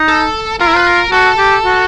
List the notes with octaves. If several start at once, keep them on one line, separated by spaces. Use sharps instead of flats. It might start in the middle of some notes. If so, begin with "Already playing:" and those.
Already playing: D#4
A4
F4 A#4
E4
F4 B4
A#4
F#4 A4
G4
F#4